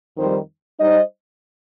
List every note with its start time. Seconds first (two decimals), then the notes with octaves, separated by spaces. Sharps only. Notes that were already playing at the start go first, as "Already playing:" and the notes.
0.16 F2 D#3 G3 D#4 C5
0.79 G3 D#4 C5 D#5